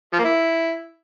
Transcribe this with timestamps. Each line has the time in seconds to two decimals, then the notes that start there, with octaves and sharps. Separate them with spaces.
0.13 F3
0.19 A#3
0.24 E4